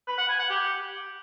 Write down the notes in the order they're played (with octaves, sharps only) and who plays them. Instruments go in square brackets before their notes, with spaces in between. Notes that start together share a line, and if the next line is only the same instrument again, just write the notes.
[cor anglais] B4
F#5
G#5
F#5
G4